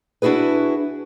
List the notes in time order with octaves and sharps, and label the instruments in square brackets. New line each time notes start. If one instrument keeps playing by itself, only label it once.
[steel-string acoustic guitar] D4 E4 F#4 G#4 B4